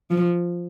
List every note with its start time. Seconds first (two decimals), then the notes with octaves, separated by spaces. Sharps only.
0.10 F3